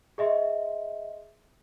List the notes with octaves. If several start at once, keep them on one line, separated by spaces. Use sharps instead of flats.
G#4 D#5 E5 C6